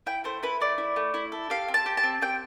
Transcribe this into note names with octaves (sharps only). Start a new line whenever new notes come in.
E4 G5
A3 C5
E4 B4
A3 D5
E4
A3
E4
A4
G4 F5
C4
A5
G4
A5
C4
C4 G5